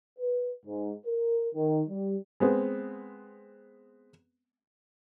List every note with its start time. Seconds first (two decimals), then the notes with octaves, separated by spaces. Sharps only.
0.19 B4
0.66 G#2
1.06 A#4
1.55 D#3
1.89 G3
2.40 G#3 B3 C4